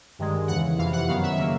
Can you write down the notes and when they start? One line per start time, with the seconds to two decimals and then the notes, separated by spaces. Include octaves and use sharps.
0.19 G2 D#3 G#3
0.48 E2 C#3 E3 F#5
0.78 F2 C3 E3 F5
0.93 F#5
1.08 F#2 D#3 F#3 B3 F5
1.23 E5
1.37 C#3 F#3 A#3 E5